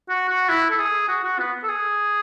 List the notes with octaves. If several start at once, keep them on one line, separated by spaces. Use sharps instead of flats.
F#4
F#4
E4
A4
G#4
F#4
F#4
B3
A4
G#4